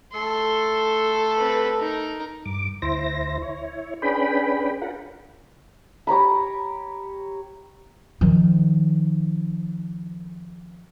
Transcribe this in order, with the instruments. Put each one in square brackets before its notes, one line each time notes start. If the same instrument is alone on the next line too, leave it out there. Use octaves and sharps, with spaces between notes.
[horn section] A3 A4 [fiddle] C6
[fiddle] C4 B4
D#4 A#4
[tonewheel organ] G2 D6
D2 E4 C5 A#6
E4 C#5
C#4 D4 G#4 B4 G5 B5
F4 A#4 F#5
[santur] G4 C#5 A#5 B5
[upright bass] D#3 F3